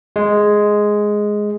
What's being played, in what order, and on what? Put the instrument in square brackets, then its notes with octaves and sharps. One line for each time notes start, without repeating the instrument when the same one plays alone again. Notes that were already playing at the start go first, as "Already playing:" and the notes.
[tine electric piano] G#3